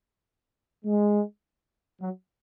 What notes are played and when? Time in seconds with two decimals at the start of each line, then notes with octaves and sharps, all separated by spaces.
0.85 G#3
2.01 F#3